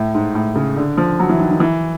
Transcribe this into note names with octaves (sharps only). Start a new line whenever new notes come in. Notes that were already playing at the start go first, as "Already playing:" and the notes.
Already playing: A2
G#2
A2
C#3
D3
F3
F#3
E3
D#3
D#3
E3